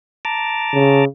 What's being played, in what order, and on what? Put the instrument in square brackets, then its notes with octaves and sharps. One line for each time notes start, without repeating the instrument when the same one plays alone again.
[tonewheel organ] A5 A#5 D6
[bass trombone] C#3